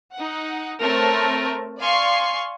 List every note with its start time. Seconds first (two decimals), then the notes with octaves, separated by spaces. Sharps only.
0.14 D#4 F#5
0.81 A3 C4 A#4 C#5 A5
1.79 D5 F5 G#5 C6 C#6 C7